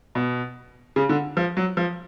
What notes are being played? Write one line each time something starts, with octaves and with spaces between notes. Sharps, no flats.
B2
C#3
D3
F3
F#3
F3